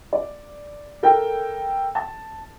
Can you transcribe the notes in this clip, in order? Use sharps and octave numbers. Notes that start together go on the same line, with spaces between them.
D5
A4 A#4 G5
A5